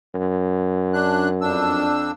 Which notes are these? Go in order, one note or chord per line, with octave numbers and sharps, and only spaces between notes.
F#2
D4 F#6
F2 D4 E6